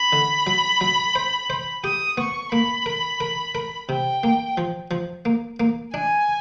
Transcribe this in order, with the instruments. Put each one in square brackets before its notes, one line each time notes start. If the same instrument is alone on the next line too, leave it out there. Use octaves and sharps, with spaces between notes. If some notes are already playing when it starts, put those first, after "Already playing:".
Already playing: [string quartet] B5
[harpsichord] D3
F#3
F#3
C5
C5
[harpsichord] G4 [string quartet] D#6
[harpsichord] B3 [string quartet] C#6
[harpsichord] A#3 [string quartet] B5
[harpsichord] A#4
A#4
A#4
[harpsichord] C3 [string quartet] G5
[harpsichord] A#3
F3
F3
A#3
A#3
[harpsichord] D4 [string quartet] G#5